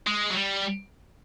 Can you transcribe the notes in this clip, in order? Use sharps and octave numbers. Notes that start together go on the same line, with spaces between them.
G#3
F#3
G3